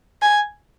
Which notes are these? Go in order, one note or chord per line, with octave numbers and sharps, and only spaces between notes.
G#5